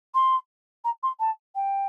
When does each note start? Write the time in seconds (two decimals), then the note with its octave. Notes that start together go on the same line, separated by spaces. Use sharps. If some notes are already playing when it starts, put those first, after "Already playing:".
0.15 C6
0.84 A#5
1.03 C6
1.20 A5
1.55 G5